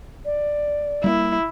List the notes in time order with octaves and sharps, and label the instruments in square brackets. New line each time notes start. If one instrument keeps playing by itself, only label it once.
[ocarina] D5
[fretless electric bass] G3 A3 A#3 [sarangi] E4